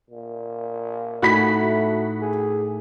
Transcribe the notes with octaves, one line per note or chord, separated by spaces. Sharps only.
A#2
A2 D#4 F#4 G#5 B5 B6
A3
G#4